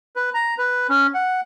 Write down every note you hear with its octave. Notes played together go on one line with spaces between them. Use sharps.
B4
A#5
B4
C#4
F#5